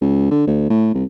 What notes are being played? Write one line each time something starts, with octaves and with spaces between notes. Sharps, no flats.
C#2
D3
D2
A2
C2